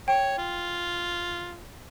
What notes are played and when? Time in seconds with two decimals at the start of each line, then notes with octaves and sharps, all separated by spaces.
0.08 C#5 G5
0.38 F4